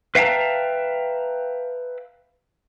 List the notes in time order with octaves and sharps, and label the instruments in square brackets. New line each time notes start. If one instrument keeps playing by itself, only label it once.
[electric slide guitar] B4 E5 F5 G5 A5 A#5